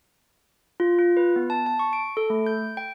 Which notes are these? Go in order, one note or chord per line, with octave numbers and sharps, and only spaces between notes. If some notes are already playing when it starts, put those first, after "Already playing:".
F4
F4
B4
B3
A5
A5
C#6
D7
A4
A3
G6
G5